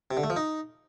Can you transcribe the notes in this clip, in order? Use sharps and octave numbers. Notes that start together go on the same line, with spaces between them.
C3
D3
A3
F3
D#4